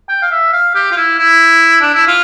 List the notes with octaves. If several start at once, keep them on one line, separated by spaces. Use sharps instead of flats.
G5
F5
E5
F5
G4
F4
E4
E4
D4
E4
F4